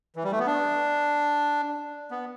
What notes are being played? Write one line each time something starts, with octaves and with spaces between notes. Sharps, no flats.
E3
G3
A3
B3
D4
B3